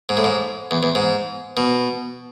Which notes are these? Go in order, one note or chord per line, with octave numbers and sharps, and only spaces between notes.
G#2
A2
G#2
E2
E2
G#2
B2